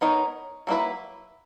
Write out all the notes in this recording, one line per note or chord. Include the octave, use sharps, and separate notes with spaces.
B3 D#4 A#4 C#5
F#3 A#3 E4 B4